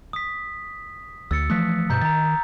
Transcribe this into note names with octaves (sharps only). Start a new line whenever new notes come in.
D#6 B6
D2 E6 A6 C#7
E3 F3 A3 D#6 F#6 B6
G2 B2 A#5 G6
D#3 A#5 A6